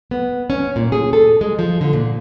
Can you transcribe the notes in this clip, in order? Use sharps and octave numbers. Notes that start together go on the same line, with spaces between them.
B3
C#4
A#2
G#4
A4
G#3
F3
D3
A#2